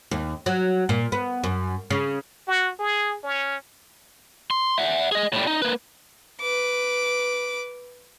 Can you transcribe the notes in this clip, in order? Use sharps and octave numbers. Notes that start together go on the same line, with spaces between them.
D#2
F#3
A#2
B3
F#2
C#3
F#4
G#4
C#4
C6
E5 F#5
G#4 D#5
A2 G3
D#4
A#3 B4
B4 D6